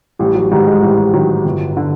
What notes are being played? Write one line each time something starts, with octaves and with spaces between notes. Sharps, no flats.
A1 G3
F#3
G#2 D#3 G3
G#3
A1 G3
G#2 D#3 F#3
G1
D3